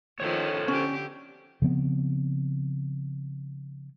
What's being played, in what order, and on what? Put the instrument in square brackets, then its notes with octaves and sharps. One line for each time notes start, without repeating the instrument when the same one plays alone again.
[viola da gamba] D#3 F3 C#4 [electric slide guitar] A4 C5 C#5
[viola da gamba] D3 G4 [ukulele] C#4
[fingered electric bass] C#3 F3 B3 C4